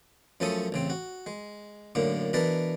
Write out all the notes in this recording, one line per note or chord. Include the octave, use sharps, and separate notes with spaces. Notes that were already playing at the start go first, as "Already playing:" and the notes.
F#2 F3 A3 C#4 A4 D#6
A1 C#3 C4
F#4
G#3
F#2 A2 D3 A#3
B2 E3 D4 A#4 A5 B5